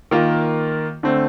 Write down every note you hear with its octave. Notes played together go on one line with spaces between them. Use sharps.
D#3 A#3 F4
D3 A3 C4